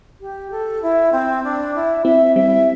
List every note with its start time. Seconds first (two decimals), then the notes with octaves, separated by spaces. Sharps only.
0.20 G4
0.51 A4
0.82 E4
1.12 C4
1.44 D4
1.75 E4
2.05 C4 E4 E5
2.35 G3 C4 E5